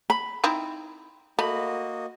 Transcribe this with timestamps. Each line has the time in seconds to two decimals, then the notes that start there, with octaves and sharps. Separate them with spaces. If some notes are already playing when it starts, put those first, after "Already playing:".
0.10 B5
0.44 C4 D#4 E4
1.39 A3 A#3 F#4 D#5 B5